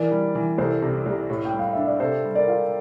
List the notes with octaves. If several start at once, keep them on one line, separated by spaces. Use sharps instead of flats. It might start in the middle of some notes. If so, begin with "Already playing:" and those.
Already playing: E3 A#4 D5
G3
E3
C2 A4 C5
C3
C2
A2
G5
G3
F5
D4 E5
D5
C3 A4 C5
G3
A#4 D5
F4